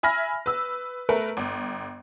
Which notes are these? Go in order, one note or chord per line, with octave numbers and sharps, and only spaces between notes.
E5 G#5 B5 F6 A#6
B4 E6
A3 A#4 B4
G1